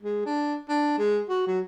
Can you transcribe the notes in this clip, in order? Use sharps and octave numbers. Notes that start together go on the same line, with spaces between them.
G#3
D4
D4
G#3
F#4
F#3